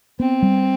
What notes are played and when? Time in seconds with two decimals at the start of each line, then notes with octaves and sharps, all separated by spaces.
0.20 B3 C4
0.43 G3